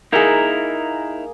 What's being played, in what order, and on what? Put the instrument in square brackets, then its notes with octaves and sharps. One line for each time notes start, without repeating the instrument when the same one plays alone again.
[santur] A#3 G#4 [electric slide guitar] D#4 E4 A#4